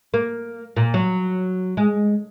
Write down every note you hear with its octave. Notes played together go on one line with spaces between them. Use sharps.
A#3
A#2
F#3
G#3